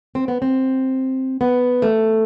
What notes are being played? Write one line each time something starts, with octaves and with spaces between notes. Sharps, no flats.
C4
B3
C4
B3
A3